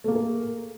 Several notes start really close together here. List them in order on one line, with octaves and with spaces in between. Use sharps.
A3 A#3 G#4 A#4